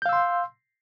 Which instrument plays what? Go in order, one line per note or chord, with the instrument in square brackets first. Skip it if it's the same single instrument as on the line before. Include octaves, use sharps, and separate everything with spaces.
[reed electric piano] G6
F5
E6
C6